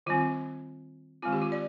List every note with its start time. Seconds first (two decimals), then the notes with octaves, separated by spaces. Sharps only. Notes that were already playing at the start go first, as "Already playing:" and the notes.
0.06 D#3 G3 C4 F4
1.22 D#3 G#3 C4 F4
1.33 G4
1.42 F4
1.52 D5